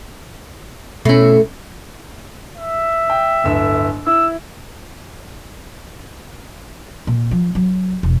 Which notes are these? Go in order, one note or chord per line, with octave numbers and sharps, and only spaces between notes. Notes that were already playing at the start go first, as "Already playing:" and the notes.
B2 A3 C#4 E4
E5
G5
D1 G1 E6
E4 E6
A#2
F3
F#3
E1